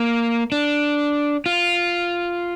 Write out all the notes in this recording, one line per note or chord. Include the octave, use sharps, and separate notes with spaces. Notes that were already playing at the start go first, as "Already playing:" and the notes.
Already playing: A#3
D4
F4